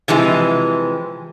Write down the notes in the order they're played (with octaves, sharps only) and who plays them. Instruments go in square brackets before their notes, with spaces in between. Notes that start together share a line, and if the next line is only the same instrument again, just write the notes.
[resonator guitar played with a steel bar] C3 E3 F3 G#3